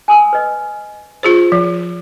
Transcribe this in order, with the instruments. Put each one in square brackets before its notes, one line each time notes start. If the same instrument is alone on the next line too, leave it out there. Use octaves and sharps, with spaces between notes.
[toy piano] G#5 D#6 E6
B4 D#5
[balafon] F4 G#4 C5
F3